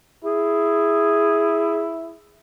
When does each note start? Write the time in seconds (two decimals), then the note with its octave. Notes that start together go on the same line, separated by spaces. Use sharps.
0.24 E4 G#4